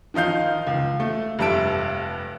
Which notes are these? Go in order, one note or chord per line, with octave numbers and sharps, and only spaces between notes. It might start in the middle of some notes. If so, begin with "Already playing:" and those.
D#3 F3 D#4 F5 G6
C#2
A3
F1 G2 E5 A5 D7